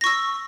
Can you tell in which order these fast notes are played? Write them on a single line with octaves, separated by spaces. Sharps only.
A#6 C#6 E6